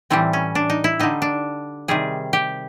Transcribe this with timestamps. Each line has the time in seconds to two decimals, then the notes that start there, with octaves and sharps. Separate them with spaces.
0.10 A2 E3 G3 C4
0.33 C#4
0.55 D4
0.70 D#4
0.84 E4
0.99 D3 G3 D#4
1.22 D4
1.88 C3 D#3 G3 G#4
2.33 G4